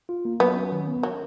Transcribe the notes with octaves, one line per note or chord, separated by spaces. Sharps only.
F4
A#3
F#3 B3
C#4
D#3
B3
F#3 A#4